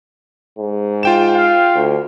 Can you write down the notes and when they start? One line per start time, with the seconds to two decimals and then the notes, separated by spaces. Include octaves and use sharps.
0.59 G#2
1.03 F4 G5 E7
1.35 F5
1.75 D2